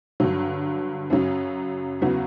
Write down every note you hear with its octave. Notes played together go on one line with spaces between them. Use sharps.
G2 D3 F#3
F#2 C#3 F#3 C#4
E2 C#3 F#3 B3 F#4